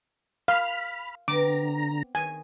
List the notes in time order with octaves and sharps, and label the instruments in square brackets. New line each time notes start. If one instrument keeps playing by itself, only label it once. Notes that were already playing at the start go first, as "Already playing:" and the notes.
[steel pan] F5 [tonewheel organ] B5 F6
[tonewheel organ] D3 A#5 [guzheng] B3 C4 [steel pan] D6
[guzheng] D#3 [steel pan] G#5